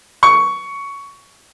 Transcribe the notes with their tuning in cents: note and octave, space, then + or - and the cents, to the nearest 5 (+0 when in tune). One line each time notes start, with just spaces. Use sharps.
C#6 +10